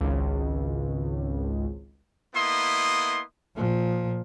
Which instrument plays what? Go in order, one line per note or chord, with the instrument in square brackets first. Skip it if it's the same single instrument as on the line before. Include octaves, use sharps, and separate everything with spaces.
[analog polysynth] G#1 C#2
[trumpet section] A#3 B3 E4 D#5 C6 D#6
[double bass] A#2 F3